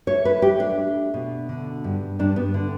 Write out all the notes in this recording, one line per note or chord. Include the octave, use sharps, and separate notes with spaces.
A3 C#5
B4
A3 G4
D4
A3
B2
D3
G2
G2 D4
B3
D3